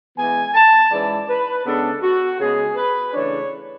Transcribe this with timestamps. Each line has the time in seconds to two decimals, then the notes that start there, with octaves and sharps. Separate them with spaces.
0.17 E3 G#3 B3 G#5
0.54 A5
0.91 G#2 E3 G#3 C#4 E4 D5
1.28 B4
1.65 C#3 G#3 B3 D4 A4
2.02 F#4
2.40 C#3 G#3 B3 G#4
2.76 B4
3.13 C#3 E3 A3 D4 C#5